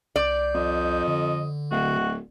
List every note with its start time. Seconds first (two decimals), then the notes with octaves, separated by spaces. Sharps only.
0.16 C2 D5 G6
0.54 F2 D#5
1.08 D3
1.71 D1 F#4